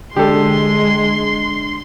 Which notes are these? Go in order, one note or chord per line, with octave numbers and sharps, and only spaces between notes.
D3 G#3 D4 G4 A4 C6